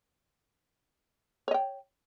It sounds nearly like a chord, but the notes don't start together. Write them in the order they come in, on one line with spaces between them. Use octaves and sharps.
C#5 D#5 G5